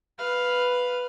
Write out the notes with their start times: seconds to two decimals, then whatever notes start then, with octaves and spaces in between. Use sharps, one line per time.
0.18 B4 F5